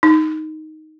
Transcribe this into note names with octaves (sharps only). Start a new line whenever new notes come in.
D#4